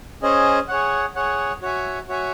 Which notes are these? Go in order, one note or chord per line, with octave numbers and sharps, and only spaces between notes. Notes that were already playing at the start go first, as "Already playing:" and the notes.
C#4 G#4 C5 D#5
G#4 C#5 F#5
G#4 C#5 F#5
F#4 C#5 E5 G#5
F#4 C#5 E5 G#5